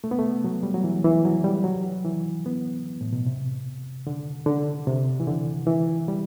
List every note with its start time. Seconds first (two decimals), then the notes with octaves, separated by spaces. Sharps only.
0.04 A3
0.11 B3
0.19 A3
0.44 F#3
0.63 G3
0.74 F#3
0.84 E3
1.05 E3
1.25 F#3
1.44 G3
1.64 F#3
2.05 E3
2.46 B3
3.01 A2
3.13 B2
3.26 C3
4.07 D3
4.46 D3
4.87 C3
5.20 E3
5.27 D3
5.67 E3
6.08 G3